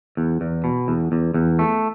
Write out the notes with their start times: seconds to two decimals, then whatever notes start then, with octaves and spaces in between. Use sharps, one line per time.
0.17 E2
0.41 E2
0.64 B2
0.88 E2
1.12 E2
1.34 E2
1.59 A3